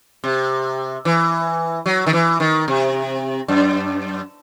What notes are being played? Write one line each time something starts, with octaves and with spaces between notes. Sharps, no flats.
C3
E3
F#3
D#3
E3
D#3
C3
F#2